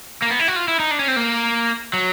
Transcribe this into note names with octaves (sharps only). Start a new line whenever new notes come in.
A#3
B3
E4
F#4
F4
E4
D#4
D4
C#4
C4
A#3
F#3